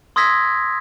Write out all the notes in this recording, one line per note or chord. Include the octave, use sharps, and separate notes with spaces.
C6 D#6 E6 G#6 A#6 B6